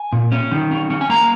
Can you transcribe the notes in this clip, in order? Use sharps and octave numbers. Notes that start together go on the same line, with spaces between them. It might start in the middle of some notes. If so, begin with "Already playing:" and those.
Already playing: G#5
A#2
C#4
D#3
C#4
C#4
G#5
A#3 A#5